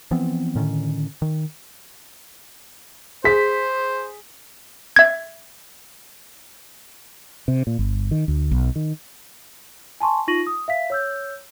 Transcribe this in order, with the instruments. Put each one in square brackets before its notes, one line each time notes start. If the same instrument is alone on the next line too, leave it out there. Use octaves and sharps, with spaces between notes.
[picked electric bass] E3 F3 B3 C4
A2 D3 D#3 C#4
D#3
[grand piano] G#4 B6 [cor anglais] C5
[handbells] E5 G#6
[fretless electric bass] C3
A#2
G1
D#3
D2
B1
D#3
[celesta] G#5 A5 C6 C#6
D#4 F4 C#6 A#6 D#7 F#7
D#6
E5 F5 B6
C#5 E6 G6